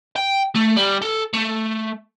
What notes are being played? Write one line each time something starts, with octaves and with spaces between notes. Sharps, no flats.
G5
A3
G3
A4
A3